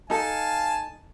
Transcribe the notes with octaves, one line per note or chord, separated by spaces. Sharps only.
D#4 A4 F5 G#5 A5